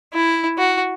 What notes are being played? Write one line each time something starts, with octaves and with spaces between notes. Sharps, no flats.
E4
F#4